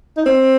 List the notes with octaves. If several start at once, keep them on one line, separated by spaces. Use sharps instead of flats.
D#4
C4